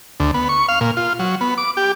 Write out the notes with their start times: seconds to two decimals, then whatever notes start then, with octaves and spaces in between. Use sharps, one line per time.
0.20 D2
0.34 B3
0.49 C#6
0.69 F5
0.81 A#2
0.97 F4
1.19 F#3
1.41 B3
1.58 D6
1.77 G4